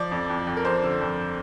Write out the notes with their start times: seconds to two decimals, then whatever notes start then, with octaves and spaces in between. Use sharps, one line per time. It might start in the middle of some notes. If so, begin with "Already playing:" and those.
Already playing: F3 D5
0.11 F2
0.29 F2
0.47 F2
0.57 A#4
0.65 F2 C5
0.83 D3
1.01 F2